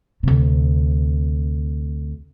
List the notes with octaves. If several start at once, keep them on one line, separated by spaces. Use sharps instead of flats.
D2 C3